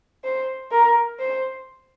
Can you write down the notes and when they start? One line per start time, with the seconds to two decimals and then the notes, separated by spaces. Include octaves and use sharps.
0.24 C5
0.71 A#4
1.20 C5